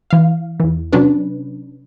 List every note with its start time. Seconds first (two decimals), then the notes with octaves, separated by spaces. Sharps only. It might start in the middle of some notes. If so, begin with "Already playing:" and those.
0.10 E3 F5
0.60 E2 E3
0.92 C3 F#3 C#4 D4 B4